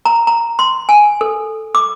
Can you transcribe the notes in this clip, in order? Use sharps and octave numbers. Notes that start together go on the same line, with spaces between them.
A#5
A#5
C6
G#5
A4
D6